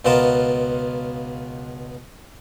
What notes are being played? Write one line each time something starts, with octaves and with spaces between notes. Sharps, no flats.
C#2 B2 B3 F4 A#4 A5